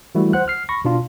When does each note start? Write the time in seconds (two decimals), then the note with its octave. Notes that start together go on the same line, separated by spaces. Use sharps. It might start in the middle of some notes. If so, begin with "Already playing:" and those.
0.15 E3 G3 A3 E4 F#4
0.33 C5 F#5 F#6
0.48 F6 C7
0.69 B5 C#6 A#6
0.85 B2 D4 F4